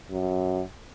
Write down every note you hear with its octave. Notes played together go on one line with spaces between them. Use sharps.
F#2